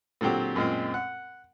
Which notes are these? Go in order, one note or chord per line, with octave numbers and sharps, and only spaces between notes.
A#2 D3 F#3 C4 G4
F#2 A#2 G#3 C4
F#5